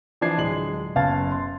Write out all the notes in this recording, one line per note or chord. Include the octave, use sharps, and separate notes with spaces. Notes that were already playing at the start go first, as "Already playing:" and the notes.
E3 F3 D4 G#6 C7
D1 G#3 C7 F#7
F#1 B3 F5 A5 G#6 A6
C6